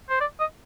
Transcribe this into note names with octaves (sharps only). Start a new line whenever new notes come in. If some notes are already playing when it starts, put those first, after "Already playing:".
C5
D5
D#5